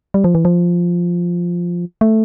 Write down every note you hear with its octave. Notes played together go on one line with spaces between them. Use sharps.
G3
F3
E3
F3
A3